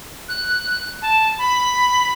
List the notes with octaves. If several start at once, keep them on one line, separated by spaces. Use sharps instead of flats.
F#6
A5
B5